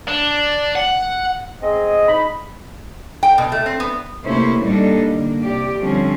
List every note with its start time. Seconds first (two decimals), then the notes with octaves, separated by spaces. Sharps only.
0.08 D4
0.76 F#5
1.62 G#3 C4 G#4 D#5
2.08 D#4 B5
3.23 G5
3.38 B2
3.52 A3
3.66 C4
3.80 B3
4.25 C3 A3 A#3 C#4 E4 C5
4.62 A#2 G3 A#3 D4 D#4 A4
5.09 D3 A#3
5.41 C3 G4 D5
5.78 D3 F3 G3 C4 C#4